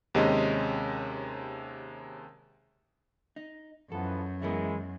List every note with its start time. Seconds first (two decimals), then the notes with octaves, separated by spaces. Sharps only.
0.14 D#2 C3 G#3 C#4 D#5
3.36 D#4
3.92 F#2 E3 F3 B3 A4
4.42 E3 G#3 B3 E4 A#4